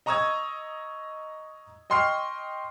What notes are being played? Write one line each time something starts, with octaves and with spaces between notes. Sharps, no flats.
D#5 A#5 C#6 D#6 E6 G#6
D#5 G5 C6 C#6 F6 C7